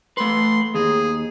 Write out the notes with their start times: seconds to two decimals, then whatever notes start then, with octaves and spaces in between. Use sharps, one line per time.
0.17 A3 B4 C6
0.75 D#2 G#4